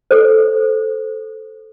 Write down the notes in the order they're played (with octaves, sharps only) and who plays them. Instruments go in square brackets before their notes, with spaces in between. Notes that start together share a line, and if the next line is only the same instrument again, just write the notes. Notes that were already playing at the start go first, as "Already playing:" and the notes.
[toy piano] A4 C5